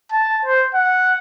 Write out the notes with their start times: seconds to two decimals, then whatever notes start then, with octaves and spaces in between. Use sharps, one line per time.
0.12 A5
0.45 C5
0.75 F#5